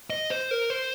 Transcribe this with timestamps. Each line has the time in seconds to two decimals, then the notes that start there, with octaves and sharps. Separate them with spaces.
0.10 D#5
0.30 C5
0.51 A#4
0.70 C5